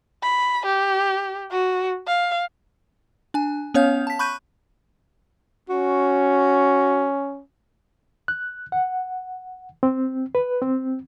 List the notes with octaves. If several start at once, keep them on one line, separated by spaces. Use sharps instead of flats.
B5
G4
F#4
F5
D4 G#5
B3 C#4 C#5 F5 G6
A5 B6
B5 C#6 F#6 G6 D#7
C#4 F#4
F#6
F#5
C4
B4
C4